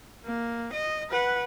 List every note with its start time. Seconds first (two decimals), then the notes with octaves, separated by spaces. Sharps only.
0.25 A#3
0.73 D#5
1.10 B4 F#5